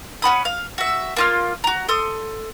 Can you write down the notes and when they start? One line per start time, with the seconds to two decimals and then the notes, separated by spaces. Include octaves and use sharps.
0.22 C#4 F#5 B5 D#6
0.45 F5
0.78 F#4 E5
1.17 A#3 F4 F6
1.64 F#4 A#5
1.89 A4 C6 D#6